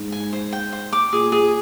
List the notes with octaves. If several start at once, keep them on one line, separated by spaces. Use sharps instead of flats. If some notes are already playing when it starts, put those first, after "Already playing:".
Already playing: G#2
G#5
C5
G5
C5
D6
A#2 G#4
G#4